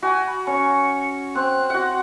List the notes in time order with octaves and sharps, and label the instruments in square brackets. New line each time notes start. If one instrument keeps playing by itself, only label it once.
[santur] F#4 [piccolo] G#5
[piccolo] B5
[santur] C#4 [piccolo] C#7
[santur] C4 [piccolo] F#6
[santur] F#4 F#5